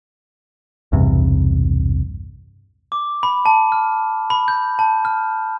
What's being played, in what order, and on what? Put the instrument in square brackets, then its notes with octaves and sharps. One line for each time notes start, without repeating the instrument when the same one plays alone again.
[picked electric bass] B1 E2 G2 C3
[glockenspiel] D6
B5
A5
F6
B5
G6
A5
F6